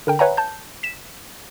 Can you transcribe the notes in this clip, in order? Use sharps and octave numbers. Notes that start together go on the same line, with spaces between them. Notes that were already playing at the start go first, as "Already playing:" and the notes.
D3 A#4 G5
B4 C#5 E5 F#5 G#5 A#5
A5 G6
B6 E7